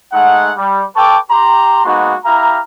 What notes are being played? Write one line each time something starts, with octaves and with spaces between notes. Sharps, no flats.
G#3 A3 D#4 F#5
G3
A4 B4 G5 A5 C#6 D6
G4 A#5 C6
G#3 A#3 B3 D#4 F#4
E4 G4 F5 A#5